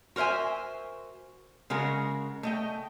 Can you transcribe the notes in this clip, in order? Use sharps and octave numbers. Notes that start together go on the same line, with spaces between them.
F#4 A#4 C5 E5 G#5
C#3 G#3 F#4 A#4
A3 D#5 G5